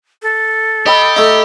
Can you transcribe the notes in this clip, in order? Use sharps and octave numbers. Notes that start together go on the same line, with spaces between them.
A4
G4 D#5 B5 E6
A3 D#4